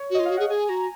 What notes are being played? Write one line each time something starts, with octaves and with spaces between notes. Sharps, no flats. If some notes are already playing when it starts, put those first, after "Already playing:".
Already playing: C#5
F#4
D#5
F4
F#4 F5
G#4 F#5
G#4 G#5
F#4 A#5